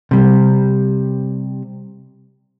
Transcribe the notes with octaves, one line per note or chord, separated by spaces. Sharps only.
C3 G3